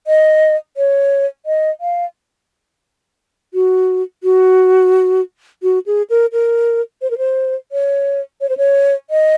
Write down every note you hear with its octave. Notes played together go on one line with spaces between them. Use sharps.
D#5
C#5
D#5
F5
F#4
F#4
F#4
G#4
A#4
A#4
C5
A#4
C5
C#5
C#5
C5
C#5
D#5